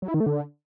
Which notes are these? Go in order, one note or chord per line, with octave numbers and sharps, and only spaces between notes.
F#3
E4
D#3
A3
D3